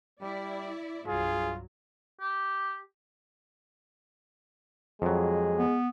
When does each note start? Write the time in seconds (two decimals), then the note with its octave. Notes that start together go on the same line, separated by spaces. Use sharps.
0.21 G3 E4 D5
1.07 C2 G2 F#3 F4 G#4
2.21 G4
5.02 F2 F#3 G#3
5.56 B3